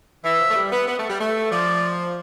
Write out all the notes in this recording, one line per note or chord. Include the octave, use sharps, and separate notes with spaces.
E3 E5
F3
A3
G3
B3
B3
A3
G3
A3
F3 D5